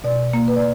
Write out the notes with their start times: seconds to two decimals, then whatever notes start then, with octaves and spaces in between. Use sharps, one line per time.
0.04 B2 D5
0.33 A#3
0.48 B4
0.56 D5